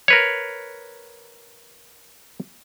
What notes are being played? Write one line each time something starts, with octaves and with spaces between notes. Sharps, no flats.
A#4 B4 C#5